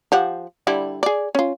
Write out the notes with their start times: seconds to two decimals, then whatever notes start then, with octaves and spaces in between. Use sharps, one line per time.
0.12 F3 G4 F#5
0.67 D3 G3 E4
1.03 G#4 D5
1.35 C#4 F4